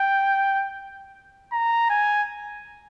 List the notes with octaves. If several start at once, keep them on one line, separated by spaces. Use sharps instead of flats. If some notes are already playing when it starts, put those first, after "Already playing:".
Already playing: G5
A#5
G#5